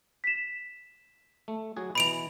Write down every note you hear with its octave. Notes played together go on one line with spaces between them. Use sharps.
B6 E7
A3
F#3 F#4 G#4
B2 E3 B5 D7 F7